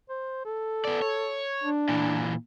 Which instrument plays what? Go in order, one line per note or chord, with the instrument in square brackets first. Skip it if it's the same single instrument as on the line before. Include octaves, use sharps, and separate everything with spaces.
[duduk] C5
A4
[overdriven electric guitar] B3 D5
C#5
[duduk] D4
[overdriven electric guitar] A#2 E3